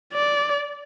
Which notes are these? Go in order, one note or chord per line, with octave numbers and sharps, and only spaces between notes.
D5